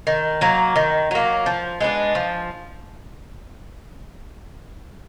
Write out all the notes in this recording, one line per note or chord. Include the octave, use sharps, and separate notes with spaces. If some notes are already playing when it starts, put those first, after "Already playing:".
D#3
F#3 A#3
D#3
F#3 A#3
F3
G#3 B3 D4
F3